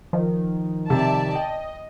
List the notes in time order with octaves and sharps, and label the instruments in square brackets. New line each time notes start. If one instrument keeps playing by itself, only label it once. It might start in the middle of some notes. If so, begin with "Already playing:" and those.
[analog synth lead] D#3 [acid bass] F3
[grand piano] C3 [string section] D5 E5 A5
[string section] D#5 [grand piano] G5